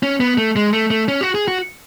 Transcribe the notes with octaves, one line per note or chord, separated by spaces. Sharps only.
C#4
B3
A3
G#3
A3
A3
C#4
F#4
G#4
F#4